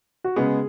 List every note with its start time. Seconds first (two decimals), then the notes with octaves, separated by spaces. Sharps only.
0.24 F#4
0.36 C#3 G#3 B3 G#4